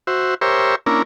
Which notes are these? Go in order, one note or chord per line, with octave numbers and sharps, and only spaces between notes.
F#4 C5 E5
G4 A#4 C5 C#5 E5
A#3 C#4 D4 E4 A#4